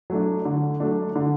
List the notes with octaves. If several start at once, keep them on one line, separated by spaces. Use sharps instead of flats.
F#3 A3 D4
D3
F#3 A3 D4
D3